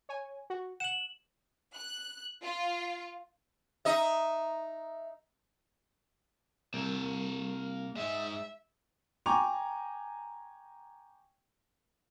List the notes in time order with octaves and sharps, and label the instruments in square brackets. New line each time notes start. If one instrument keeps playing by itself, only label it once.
[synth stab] C#5 G#5
F#4
[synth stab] F#5 [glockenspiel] E7 F#7
[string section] F#6
F4
[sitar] D#4 D#5 E5
[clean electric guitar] C2 [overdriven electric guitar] A#3 E5
[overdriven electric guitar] G#3 D#4 [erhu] E5
[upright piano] G5 G#5 A#5 C#6 D6 F7